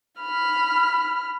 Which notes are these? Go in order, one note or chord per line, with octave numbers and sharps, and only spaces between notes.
B5 F6